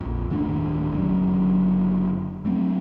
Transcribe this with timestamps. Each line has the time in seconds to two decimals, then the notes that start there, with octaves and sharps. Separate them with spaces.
0.01 A#1 F2
0.30 D1 D#3 A3 D4
0.91 F#1 F#2 D3 F#3
2.45 F#3 A3 C4